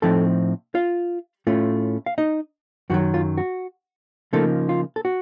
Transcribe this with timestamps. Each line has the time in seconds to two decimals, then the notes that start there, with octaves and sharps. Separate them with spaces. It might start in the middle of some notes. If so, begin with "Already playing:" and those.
0.02 A2 F3 C4 D#4 A4 A5
0.75 F4 F5
1.47 A2 A3 C#4 F4
2.06 F5
2.18 D#4 D#5
2.90 F#2 D#3 F#3 F#4
3.14 F4
3.37 F#4
4.33 C#3 F3 A3 A#3 D#4 A4
4.69 F4
4.96 A4
5.05 F#4